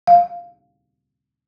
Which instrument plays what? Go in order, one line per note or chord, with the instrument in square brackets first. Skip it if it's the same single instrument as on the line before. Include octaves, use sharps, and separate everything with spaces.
[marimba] F5